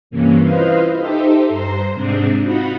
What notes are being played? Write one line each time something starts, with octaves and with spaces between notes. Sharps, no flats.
G2 C3 E3 A#3 C#4
E4 F4 B4 C5 D#5 F5
D#4 G4 A4 C5 E5
G2 C5 A#5 C6
G#2 C3 G#3 C4 D4 G#4
D#4 F4 F#4 D#5 F#5 B5